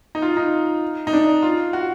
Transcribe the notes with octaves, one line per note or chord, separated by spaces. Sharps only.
D#4
F4
D#4
D#4
D4
F4
F#4